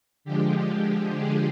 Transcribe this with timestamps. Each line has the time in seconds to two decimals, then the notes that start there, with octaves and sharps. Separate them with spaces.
0.25 D3 F3 G#3 G4
0.70 G4
1.15 G#3 G#4